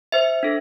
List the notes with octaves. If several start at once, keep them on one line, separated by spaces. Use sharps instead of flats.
C5 E5
D4 A4